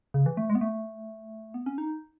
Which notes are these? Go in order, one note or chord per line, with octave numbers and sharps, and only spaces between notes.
C#3
E3
A3
G#3
B3
A3
B3
C#4
D#4